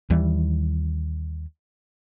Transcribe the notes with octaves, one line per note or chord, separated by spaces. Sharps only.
D#2 E3 G3